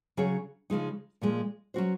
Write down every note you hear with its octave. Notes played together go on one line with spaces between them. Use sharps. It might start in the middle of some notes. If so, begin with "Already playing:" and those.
C#3 F#3 C#4 G#4 C#5
C#3 F3 G#3 D#4
A#2 F3 G#3
F#3 C#4 F#4 C5